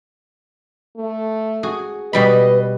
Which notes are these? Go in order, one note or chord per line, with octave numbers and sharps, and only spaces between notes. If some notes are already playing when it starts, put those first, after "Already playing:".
A3
F#4 G#4
B2 G3 B4 D#5 B5